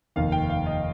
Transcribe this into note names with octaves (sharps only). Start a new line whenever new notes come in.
F1 D#2 D#3 F5
G5
F5
D#5